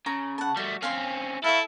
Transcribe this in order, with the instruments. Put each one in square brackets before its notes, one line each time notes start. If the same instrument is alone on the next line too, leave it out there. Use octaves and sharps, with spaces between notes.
[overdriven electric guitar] C#3 [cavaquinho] A#5
[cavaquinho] F#5 A5
[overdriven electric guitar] G3 A3 [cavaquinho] F#4
[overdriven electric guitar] C4 C#4 [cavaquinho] F5 G#5 C6
[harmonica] E4 [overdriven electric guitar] A4 [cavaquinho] C#5 F5